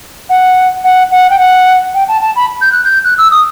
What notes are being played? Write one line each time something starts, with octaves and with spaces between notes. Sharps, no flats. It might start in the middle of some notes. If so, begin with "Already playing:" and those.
F#5
F#5
F#5
G5
F#5
G5
A5
A5
B5
G6
F#6
G6
F#6
E6
D#6